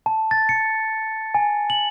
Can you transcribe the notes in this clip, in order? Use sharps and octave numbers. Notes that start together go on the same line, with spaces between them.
A5
A6
C#7
G#5
F#7